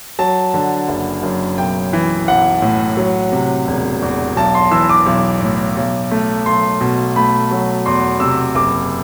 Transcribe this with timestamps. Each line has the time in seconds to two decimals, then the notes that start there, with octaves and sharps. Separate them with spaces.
0.19 F#3 A5
0.54 D3
0.88 F#1
1.23 F#2
1.58 B1 G5
1.93 E3
2.28 B1 F#5
2.62 A2
2.97 F#3
3.32 C3
3.67 E1
4.02 E2
4.36 B1 A5
4.55 C6
4.71 E3 E6
4.89 D6
5.06 B1
5.41 A2
5.77 B1
6.11 A3
6.46 B1 C6
6.81 B2
7.16 A3 B5
7.51 F#3
7.86 E2 C6
8.20 C3 E6
8.55 F#1 D6